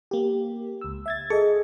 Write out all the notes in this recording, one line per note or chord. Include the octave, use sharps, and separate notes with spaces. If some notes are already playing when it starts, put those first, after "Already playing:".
A#3 G4
C#2 E6
E5 G#6 A6
G#4 A4 D#5